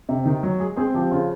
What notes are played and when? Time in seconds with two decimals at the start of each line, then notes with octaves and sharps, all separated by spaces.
0.09 C3
0.26 D#3
0.43 F#3
0.60 G#3 G#4
0.76 C4 G#4
0.94 F3 G4
1.11 C#3 F4